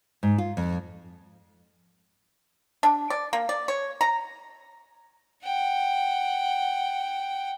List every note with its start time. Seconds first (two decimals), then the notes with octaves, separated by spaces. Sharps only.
0.23 G#2
0.38 F4
0.57 F2
2.83 D4
3.10 D5
3.33 A#3
3.49 D5
3.68 C#5
4.01 A#5
5.44 F#5 G5